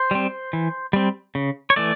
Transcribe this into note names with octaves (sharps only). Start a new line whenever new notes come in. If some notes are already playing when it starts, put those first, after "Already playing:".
Already playing: C5
G3 C4
E3
G3 C4
C#3
C#5
E3 A3 D5